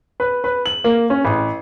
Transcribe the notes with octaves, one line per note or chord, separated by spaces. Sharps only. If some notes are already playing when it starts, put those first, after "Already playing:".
B4
B4
F#7
A#3
C#4
A1